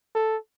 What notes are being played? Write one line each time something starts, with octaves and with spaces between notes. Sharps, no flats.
A4